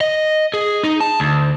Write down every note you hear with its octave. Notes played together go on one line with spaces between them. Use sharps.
D#5
G#4
D#4
A5
D2